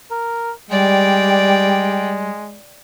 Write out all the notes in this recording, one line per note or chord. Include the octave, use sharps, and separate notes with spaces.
A#4
G3 G#3 D5 G5